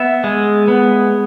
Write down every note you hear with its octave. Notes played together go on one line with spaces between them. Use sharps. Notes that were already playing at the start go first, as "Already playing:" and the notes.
Already playing: B3 E5
G#3
B3